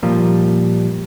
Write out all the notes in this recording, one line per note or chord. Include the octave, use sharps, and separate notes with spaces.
A#2 F3 G3 A#3